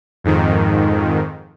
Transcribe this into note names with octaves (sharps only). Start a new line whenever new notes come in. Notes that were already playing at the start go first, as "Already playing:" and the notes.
F2 G#2 D#3